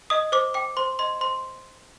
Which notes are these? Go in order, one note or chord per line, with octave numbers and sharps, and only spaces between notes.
D#5 D#6
C5 D6
G5 D6
C5 C6
D#5 C6
C5 C6